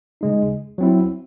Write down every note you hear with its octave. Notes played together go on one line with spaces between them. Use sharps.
C#3 G#3 D#4
F#3 C4 E4